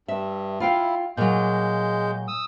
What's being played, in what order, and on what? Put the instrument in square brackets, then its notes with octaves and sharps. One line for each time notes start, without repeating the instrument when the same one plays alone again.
[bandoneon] G2 [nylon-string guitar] E5
[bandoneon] E4 [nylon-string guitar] F4 F5 G5
[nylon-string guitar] A#2 F#3 [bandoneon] G#3 G6
[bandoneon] D#6 E6